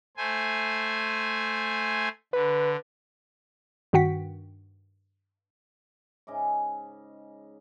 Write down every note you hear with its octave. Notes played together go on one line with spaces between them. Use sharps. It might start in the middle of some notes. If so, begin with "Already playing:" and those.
A3 C5 G#5
D3 B4
G2 D#3 F#4 F#5 G5 B6
G#2 C#3 D#5 D6